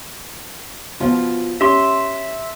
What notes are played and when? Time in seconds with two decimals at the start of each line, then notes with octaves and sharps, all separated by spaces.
1.00 B2 F3 F4
1.61 C#4 G4 E5 C6